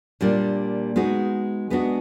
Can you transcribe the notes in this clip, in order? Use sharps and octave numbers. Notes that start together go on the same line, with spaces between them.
A#2 G3 A#3 D4
G#3 B3 D#4 F#4
G#3 B3 D4 F#4